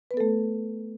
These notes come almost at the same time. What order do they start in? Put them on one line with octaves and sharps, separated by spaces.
B4 B3 A4 A3